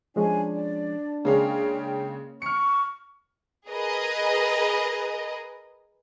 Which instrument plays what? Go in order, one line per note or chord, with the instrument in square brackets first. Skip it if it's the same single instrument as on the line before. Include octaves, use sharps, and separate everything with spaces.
[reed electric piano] F3 G#3 C#4 [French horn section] D4 [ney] G#5
[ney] D5
[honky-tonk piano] C#3 G#3 F5 [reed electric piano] A#3 C#4 [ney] G5
[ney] C#6 [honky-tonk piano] F6 C#7
[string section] G#4 A#4 B4 D#5